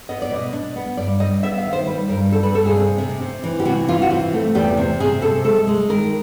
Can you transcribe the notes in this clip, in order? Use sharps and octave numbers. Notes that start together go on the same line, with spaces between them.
B3 D#5
D5
B2
D#5
D4
B3
G2 D5
G3 D#5
B3 E5
F5
D#3
C5
G3 B4
G2 A#4
G3 A4
B4
G2 A4
G#4
C3
C3
C3
E3
G4
C3 F#4
E3 F4
F#4
C3 F4
A3
E2 G4
C3
C3 G#4
C3 A4
G#3 A4
G#3
D#3 A#4